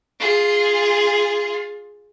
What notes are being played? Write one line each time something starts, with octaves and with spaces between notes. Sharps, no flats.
F4 G#4